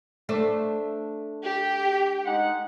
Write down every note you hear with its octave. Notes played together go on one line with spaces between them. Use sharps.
A3 D4 C5
G4
G#3 D#4 F#5